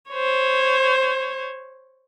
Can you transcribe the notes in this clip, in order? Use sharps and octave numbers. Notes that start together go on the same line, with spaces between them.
C5 C#5